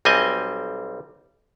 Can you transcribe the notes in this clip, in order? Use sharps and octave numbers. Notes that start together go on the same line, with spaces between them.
B1 G3 C4 D#5 G#5